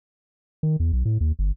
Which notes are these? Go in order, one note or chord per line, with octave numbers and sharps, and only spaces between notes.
D#3
E2
B1
A2
D#2
G1